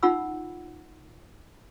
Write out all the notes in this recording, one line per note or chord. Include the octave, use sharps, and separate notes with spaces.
C#4 D#4 F4 F#5 B5 E6